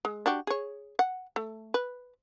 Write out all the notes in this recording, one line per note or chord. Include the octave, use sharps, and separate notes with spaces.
G#3
D4 F#4 G4
G#4 C#5
F#5
A3
B4